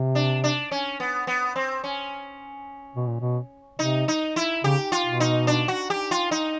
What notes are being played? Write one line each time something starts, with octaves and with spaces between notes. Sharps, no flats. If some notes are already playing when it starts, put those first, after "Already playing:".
Already playing: C3
D4
D4
C#4
B3
B3
C4
C#4
B2
A#2
B2
C3 D#4
D#4
E4
C#3 G4
F4
B2
D#4
D4
F#4
G4
F4
D#4